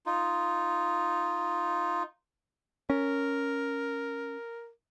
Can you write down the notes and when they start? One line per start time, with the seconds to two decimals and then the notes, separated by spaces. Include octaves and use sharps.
0.06 D#4 F4
2.90 C#4 A#4